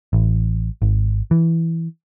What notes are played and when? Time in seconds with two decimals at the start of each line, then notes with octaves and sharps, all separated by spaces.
0.13 A1
0.82 G#1
1.31 E3